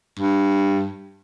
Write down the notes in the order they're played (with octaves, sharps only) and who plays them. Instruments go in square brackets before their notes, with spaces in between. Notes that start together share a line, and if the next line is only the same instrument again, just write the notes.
[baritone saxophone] G2